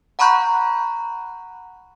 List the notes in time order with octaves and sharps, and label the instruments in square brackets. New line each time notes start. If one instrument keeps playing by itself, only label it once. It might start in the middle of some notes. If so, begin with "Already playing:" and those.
[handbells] F#5 A#5 B5 C#6 F#6 G6